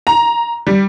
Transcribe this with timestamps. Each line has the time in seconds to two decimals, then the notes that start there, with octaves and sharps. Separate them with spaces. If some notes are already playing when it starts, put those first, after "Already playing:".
0.07 A#5
0.67 G3